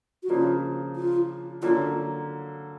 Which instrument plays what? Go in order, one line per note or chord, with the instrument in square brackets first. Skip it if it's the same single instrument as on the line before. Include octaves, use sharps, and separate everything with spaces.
[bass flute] F#4
[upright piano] C#3 F3 A#3 D4 [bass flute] F4
[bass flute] F4
[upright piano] D3 F#3 A#3 C#4 [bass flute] F4